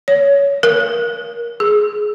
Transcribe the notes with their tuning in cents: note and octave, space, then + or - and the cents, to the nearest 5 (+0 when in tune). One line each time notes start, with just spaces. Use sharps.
C#5 +20
A#4 +15
G#4 +10